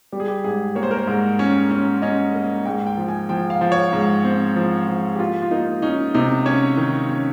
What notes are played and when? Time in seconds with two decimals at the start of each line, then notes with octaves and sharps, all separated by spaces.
0.12 G3 G4
0.20 G#4
0.28 G4
0.44 G#2 G#4
0.75 A#3 C#5
0.83 C5
0.91 A#4
0.97 C5
1.07 G#2
1.39 C#4
1.71 C#4
2.02 C#4 D#5
2.34 A#3
2.65 G#2 G5
2.87 G5
2.98 F3
3.08 G#5
3.29 F3 G5
3.50 F5
3.61 F3
3.72 C#5
3.93 G#2
4.24 C4
4.56 F3
4.87 F3
5.15 G4
5.19 A#3 F4
5.42 F4
5.51 A#3 D#4
5.82 C#4 D#4
6.14 C3 D#4
6.46 C#4 C#5
6.77 D#3
7.09 C#4